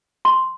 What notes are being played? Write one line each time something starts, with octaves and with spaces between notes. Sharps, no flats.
C6